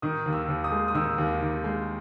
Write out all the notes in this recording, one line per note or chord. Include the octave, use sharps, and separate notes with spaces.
D#3 D#6
D#2
E6
D#2
D#6
G#3
D#6
D#3 E6
D#2
D#2
G#3